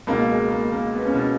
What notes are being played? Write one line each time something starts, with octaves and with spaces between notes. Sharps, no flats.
C#2 B2 A#3
G#3
A#3
A#3
B3
C#4
B2 B3